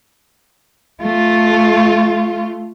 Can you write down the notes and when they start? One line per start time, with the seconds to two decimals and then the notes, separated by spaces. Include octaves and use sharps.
1.01 A3 F4